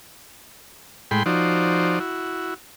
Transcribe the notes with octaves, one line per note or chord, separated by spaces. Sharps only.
A2 G#3 G5 B5 C6
F3 D#4 F#4 C5 D5
E4 F#4